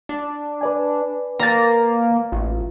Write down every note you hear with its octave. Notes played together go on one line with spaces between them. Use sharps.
D4
B4 D5 G#5
A#3 A#5 A6
A1 F4